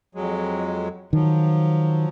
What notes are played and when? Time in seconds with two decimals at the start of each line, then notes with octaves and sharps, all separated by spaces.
0.15 F2 F#3 G#3
1.13 D#3 F3 F#3